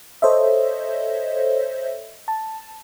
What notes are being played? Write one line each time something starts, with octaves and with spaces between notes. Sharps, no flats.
A4 C5 C#5 D#5 E5
A5